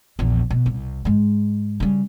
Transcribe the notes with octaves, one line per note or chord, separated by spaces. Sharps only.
A#1 E2
B2
C2
G#2 G#3
C#3 G3